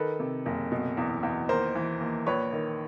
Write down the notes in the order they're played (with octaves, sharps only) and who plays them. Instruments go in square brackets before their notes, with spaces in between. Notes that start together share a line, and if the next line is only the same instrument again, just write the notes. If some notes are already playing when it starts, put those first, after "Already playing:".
Already playing: [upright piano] D#3 A4 B4
C3
F#1
B2
E2
E2
D#2 A#4 C5
E3
D#2
A#1 B4 C#5
D#3